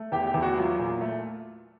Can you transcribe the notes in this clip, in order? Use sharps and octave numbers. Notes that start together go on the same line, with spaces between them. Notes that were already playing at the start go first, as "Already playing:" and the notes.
Already playing: A3
E2 G4
G4
E2
F#4
F#3 F4
A#2
A3